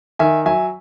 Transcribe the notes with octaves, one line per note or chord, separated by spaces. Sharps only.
D#3 E5 G#5
F#3 E5 G#5